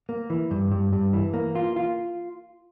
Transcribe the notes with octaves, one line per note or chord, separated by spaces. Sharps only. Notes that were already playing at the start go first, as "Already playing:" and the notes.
A#3
E3
G2
G2
G2
E3
A#3
F4
F4